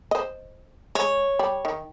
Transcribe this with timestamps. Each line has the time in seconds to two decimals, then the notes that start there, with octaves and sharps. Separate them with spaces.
0.11 C5 D#5
0.95 G#3 C#5
1.39 G3
1.65 D#3